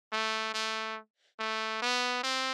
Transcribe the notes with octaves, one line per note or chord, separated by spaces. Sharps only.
A3
A3
A3
B3
C4